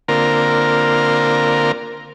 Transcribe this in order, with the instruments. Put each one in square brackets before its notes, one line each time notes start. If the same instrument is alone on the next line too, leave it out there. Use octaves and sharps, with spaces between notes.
[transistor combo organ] D3 A#3 C4 F4 A#4